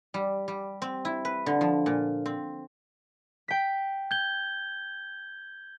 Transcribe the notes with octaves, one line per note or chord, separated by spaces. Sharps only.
G3
G3
C4
E4
B4
D3
F3
A#2
C4
G5 B6
G6 G#6 G7